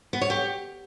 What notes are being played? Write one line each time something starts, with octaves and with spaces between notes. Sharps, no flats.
B3
C#5
G4